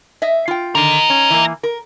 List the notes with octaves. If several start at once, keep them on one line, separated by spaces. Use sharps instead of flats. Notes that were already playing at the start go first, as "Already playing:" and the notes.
D#5 E5
F4 G5
D3 D#3 D#4 A#4
C#4
E3 A#3
A#4